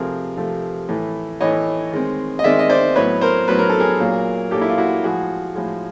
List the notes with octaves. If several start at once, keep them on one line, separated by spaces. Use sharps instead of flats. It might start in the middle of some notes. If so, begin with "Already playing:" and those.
Already playing: C3 F3 A3 C4 G#4 A#4
C3 F3 A3 C4
A2 E3 A3
A2 E3 A3 C#5 D#5
D#3 G#3 C4
D#5
D#3 G#3 C4 D5 E5
D#5
C5 D5
A2 F#3 B3 B4 C#5
A#4 C5
A2 F#3 B3 B4
A#4
A4
G#4 A#4
A#2 F#3 A#3
A#2 F#3 A#3 G4 A4
E4
F4
E4 F#4
A2 F3 G#3 F#4 G#4
A2 F3 G#3